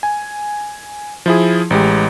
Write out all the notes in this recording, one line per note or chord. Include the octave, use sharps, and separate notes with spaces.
G#5
F3 E4 G#4
A1 G#3 G4